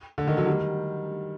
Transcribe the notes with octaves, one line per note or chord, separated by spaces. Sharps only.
D3
D#3
D3 F#3
D#3 G3